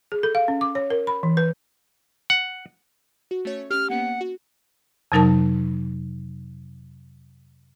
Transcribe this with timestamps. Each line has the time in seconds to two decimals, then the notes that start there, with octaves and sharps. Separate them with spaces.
0.12 G#4
0.23 A4
0.35 F5
0.48 C#4
0.61 D6
0.75 C#5
0.90 A#4
1.07 B5
1.23 E3
1.37 B4
2.30 F#5
3.31 F#4
3.45 A3 C#4 C#5
3.71 C#4 G4 F6
3.90 A#3 B3 C#4 F#5
4.21 F#4
5.12 F2 C3 F#3 D#4 A#4 A5